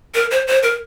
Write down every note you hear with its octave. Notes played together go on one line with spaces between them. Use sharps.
A#4
C5
C5
A#4